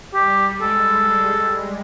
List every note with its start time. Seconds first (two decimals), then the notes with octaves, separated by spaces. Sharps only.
0.14 G3 G4
0.61 G#3 A4